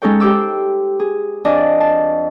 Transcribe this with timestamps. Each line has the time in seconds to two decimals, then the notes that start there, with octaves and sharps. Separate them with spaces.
0.02 G#3 C#4 D#4 A4 C#5 G5
0.20 G4 C5 G5 D6 E6
1.00 G#4
1.45 F2 D4 D5 D#5 G#5 A5
1.80 A5